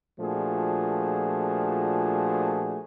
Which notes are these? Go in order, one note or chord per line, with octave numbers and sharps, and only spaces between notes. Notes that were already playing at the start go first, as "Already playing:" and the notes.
A#2 F3 A3 D4 F#4 G#4